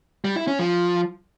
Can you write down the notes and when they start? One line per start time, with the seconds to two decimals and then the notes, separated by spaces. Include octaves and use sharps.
0.25 G3
0.36 E4
0.48 C#4
0.59 F3